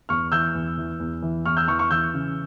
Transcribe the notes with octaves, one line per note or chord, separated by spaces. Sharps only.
E2 C#6 F6
E3 E6 G6
E2
E3
E2
E3
E2 C#6 F6
E6 G6
E3 C#6 F6
C#6 F6
E3 E6 G6
C#3